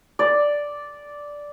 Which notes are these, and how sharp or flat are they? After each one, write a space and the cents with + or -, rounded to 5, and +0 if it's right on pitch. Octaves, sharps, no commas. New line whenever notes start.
D5 -5